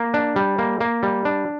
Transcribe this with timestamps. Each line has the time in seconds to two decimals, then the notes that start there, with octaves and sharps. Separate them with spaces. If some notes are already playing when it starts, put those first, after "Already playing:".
Already playing: A#3
0.14 D4
0.36 G3
0.59 A#3
0.81 A#3
1.03 G3
1.25 D4